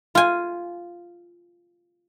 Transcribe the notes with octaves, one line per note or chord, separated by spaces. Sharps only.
F4 G#5